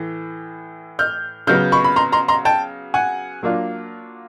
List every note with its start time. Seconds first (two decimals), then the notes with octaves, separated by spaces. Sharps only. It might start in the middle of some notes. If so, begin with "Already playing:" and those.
Already playing: A2 E3
0.99 F6 G6
1.47 C#3 F#3 B3 F6 G6
1.72 B5 C#6
1.84 B5
1.96 A#5 C6
2.12 A#5 C6
2.28 A#5 C6
2.45 G5 A5
2.94 F#5 G#5
3.43 F#3 A#3 D4 F4